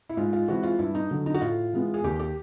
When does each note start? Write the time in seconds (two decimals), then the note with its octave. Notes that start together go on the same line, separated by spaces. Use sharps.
0.09 E4
0.17 G#2 F4
0.33 F4
0.48 E3 G#3 C4 F#4
0.63 F4
0.79 G2 E4
0.95 D#4
1.11 D3 F#3
1.26 D#4
1.34 F#4
1.41 A2 F4
1.73 E3 G#3 B3
1.94 G#4
2.04 D#2 G4
2.20 G4